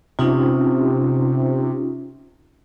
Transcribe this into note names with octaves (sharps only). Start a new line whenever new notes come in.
C3 C#4 D#4 F4